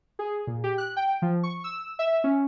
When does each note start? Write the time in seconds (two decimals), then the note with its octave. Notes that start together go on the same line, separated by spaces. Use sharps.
0.19 G#4
0.47 A#2
0.64 G4
0.78 F#6
0.96 G5
1.22 F3
1.43 C#6
1.64 E6
1.99 E5
2.24 C#4